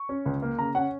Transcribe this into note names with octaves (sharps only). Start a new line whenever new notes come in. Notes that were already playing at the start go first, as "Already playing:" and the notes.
Already playing: C#6
C#4
C#2
A#3
C#3 A#5
C#4 F#5